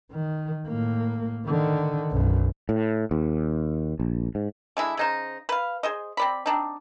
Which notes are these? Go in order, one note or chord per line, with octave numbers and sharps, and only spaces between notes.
D#3
A2 A#3
D3 D#3
B1 F#2
A2
D#2
A#1
G#2
D3 G#3 E4
C#3 D#4 C5
B4 F5
G#4 C5 D#5
C4 D5 B5
C4 D4 D#4